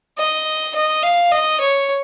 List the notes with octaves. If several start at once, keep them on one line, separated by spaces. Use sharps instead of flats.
D#5
D#5
F5
D#5
C#5